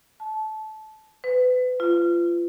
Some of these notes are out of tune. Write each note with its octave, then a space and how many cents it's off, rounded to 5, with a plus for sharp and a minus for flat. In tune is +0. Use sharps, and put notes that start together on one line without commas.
A5 -20
B4 +30
F4 -25